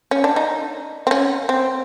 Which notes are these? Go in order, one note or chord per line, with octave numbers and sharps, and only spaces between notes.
C#4
D4
D#4
C4
C#4
C4